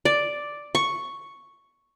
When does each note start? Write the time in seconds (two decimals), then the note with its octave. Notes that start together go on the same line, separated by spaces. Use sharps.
0.05 D5
0.75 C#6